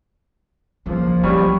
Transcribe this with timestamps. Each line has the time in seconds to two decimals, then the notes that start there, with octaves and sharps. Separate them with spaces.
0.86 C2 C#3 F3 A#3
1.23 F#3 G3 C#4